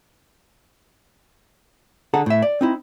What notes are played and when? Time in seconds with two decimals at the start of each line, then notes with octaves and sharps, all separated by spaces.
2.14 D3 G#4 A4 F#5 A#5
2.26 A2 E5
2.42 D5
2.61 C4 D#4 E4